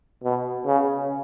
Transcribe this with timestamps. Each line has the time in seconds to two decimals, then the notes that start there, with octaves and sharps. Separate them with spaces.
0.24 B2
0.66 C#3